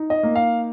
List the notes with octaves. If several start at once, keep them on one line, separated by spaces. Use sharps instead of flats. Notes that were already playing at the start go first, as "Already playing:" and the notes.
Already playing: D#4
D#5
A#3
F5